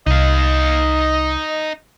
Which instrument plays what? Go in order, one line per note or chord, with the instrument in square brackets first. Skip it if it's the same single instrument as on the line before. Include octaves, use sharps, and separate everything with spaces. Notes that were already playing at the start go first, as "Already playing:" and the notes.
[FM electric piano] C2 [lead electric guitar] D#4 F5 [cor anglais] D#5